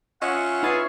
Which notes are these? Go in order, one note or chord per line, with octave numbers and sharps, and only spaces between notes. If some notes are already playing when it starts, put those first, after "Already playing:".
C#4 F4 C#5 D#5 E5 F#5
D#4 G#4 B4 A6